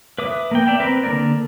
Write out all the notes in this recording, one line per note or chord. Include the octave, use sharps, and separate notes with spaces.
B4 E5 D6 D#6
A#3 B3 G5
D5 E5 G5
C4 A#4 B4
D3 A#3 A#4 D5